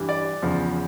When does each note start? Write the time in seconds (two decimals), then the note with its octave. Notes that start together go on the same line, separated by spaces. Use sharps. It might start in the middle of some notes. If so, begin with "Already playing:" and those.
Already playing: G2 E3 G3
0.09 D5
0.42 E2 C#3 F3